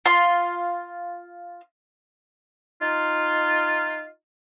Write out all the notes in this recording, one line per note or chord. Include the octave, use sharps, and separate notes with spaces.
F4 C6
D#4 F4